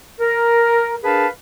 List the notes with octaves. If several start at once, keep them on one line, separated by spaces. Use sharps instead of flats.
A#4
D4 G#4 A#4 B4 F5 A5